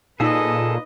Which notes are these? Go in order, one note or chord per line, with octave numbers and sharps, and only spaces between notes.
A#2 D#4 G#4 A4 B4 D#5 F5 E6